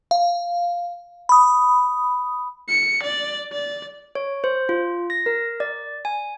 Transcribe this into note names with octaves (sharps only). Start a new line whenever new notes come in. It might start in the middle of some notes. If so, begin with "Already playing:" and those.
F5
B5 D#6
C#7
D5
D5
C#5
C5
F4
A#6
A#4
D5
G#5